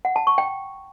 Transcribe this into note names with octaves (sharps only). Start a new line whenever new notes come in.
F#5
A5
C#6
G5